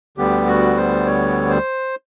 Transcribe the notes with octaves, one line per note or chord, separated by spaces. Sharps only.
D2 D3 G3 B3 G4
F#4
C5
C#5
C5